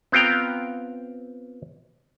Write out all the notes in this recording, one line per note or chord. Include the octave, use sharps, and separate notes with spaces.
B3 C4 F4 G5 A#5